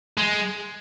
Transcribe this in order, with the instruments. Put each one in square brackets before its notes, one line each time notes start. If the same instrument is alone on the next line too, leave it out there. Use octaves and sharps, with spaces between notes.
[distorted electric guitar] G#3